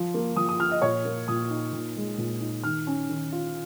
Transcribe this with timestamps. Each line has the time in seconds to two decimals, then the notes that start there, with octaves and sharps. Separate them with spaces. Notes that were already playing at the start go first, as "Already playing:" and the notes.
Already playing: F3 F4
0.14 A#3
0.36 F3 D#6
0.49 D#6
0.60 F4 F6
0.71 D#5
0.82 A#2 C#5
1.05 A#3
1.28 A#2 D#6
1.50 D#4
1.73 A#2
1.97 G#3
2.18 A#2
2.41 D#4
2.63 D#3 F6
2.87 C#4
3.09 D#3
3.32 F4